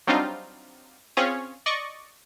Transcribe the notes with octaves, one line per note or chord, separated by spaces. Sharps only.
F#3 G3 C4 D4 D#4 F4
C4 C#4 F4 G#4 C#5
D5 D#5 C#6